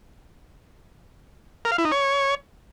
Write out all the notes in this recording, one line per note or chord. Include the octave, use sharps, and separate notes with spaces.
A#4
F5
E4
D#4
C#5